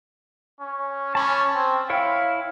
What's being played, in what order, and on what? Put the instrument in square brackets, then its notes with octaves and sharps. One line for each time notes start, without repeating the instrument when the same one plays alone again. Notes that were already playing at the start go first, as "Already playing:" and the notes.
[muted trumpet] C#4
[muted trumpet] C#4 [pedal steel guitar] A5 B5 D6
[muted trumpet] C4
[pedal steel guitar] E4 C#5 G5 [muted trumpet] F5